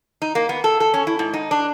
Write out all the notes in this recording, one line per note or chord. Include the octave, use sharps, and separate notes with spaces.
D#4
A#3
B3
A4
A4
C#4
E4
G#2
D#4
D4